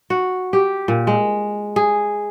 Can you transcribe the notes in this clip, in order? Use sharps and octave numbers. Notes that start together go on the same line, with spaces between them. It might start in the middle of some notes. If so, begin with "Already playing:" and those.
F#4
G4
A#2
G#3
G#4